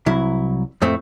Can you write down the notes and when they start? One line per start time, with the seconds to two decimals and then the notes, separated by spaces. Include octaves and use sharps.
0.06 C2 F#3 E4
0.82 F2 A2 A3 C4